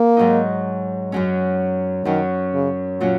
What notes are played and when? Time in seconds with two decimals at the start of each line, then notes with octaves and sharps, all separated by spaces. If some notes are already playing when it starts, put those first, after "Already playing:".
Already playing: A#3
0.17 G#2 F#3 D#4
1.12 F#2 F#3 C#4
2.05 F#2 D#3 F#3 C#4
2.54 C#3
3.00 A#2 F#3 C#4